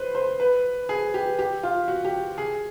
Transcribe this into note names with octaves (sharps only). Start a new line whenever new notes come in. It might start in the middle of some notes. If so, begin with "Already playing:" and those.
Already playing: B4 C5
C5
B4
G#4
G4
G4
F4
F#4
G4
G#4